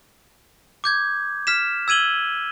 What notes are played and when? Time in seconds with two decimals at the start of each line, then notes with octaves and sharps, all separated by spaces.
0.84 D6 G6 G#6
1.47 F6 B6 E7
1.88 E6 G#6 D#7 F#7 G7